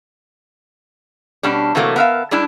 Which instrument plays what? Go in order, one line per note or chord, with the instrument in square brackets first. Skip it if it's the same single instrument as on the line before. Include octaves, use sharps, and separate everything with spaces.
[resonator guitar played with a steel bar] B2 G3 C#4 D4
C3 E3 F#3 A3 A#3
B3 A#4 E5 F5
G3 G#3 D4 E4